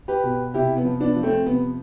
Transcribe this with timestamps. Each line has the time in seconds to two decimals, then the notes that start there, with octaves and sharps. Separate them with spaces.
0.08 G4 B4
0.24 B2
0.54 C3 E4 G4
0.77 B3
0.85 F3
1.00 B3 D4
1.16 F3
1.23 A3 C4
1.46 C3 B3